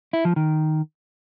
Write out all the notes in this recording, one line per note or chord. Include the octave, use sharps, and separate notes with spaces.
E4
F3
D#3